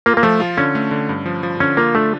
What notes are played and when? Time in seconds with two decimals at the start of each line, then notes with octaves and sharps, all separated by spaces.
0.06 A#3 F4
0.17 A#3
0.23 F3 A3
0.40 F4
0.57 D3 C#4
0.75 A3
0.91 D3
1.09 G2
1.26 F3
1.43 F3
1.60 D3 C#4
1.77 A#3 F4
1.94 A3 D4